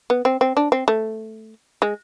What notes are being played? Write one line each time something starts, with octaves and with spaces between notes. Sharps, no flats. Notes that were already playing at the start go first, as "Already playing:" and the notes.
B3
C4
C4
D4
C4
A3
G#3